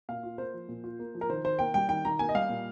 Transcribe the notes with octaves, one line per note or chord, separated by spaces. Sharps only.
A#2 F5
F4
A#3 C5
F3
A#2
F4
A#3
F3
A#4
D#3 C5
D#3 C5
A#3 G5
G3 G5
D#3 G5
D#3 A#5
A#3 G#5
D#5
G3 F5
A#2